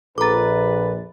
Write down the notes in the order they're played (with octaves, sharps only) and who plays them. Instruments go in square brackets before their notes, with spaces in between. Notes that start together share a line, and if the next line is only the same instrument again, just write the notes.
[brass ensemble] A#1 [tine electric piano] A4 A6 [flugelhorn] B4 [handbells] A#5 D6